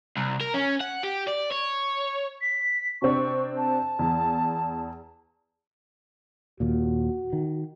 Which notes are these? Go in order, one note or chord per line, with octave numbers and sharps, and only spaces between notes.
C2
A#4
C#4
F#5
G4
D5
C#5
B6
C3 C4 D4 C#6
A5
E2
D#2 A#2 F#4
D#3